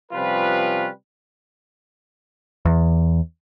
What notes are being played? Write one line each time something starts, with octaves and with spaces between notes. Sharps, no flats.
C3 F3 G3 C#4 F4 B4
E2